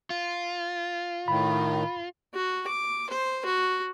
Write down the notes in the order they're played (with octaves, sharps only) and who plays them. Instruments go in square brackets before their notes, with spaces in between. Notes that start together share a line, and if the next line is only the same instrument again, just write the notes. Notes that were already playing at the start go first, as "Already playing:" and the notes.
[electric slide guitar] F4
[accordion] A2 D#3 [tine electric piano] B5
[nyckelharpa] F#4
D6
C5
F#4